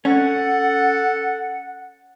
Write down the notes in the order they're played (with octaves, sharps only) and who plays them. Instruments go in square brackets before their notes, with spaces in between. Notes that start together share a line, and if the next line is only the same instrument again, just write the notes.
[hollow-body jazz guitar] C#4 [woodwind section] A4 F#5